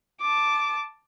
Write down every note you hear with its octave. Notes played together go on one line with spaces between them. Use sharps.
A5 D6